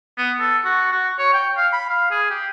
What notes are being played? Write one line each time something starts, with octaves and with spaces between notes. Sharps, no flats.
B3
A4
F#4
F#4
C#5
G5
F5
B5
F5
G#4
G4